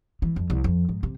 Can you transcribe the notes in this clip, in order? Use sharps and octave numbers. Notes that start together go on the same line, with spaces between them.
E3
F2
C2
F2
G#2
C3